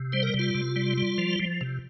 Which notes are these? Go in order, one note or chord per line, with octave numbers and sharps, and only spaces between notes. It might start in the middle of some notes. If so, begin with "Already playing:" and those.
Already playing: C3
G3 C5
A#4
C3
F4
C3
G3
G3
F3
F3
C3